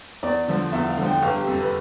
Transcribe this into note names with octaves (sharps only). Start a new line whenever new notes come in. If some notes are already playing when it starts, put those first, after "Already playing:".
E2 D5
D3 F3
E2 E5
F5
D3 F3
G5
G1 F5
G4
F2 C3 A4
B4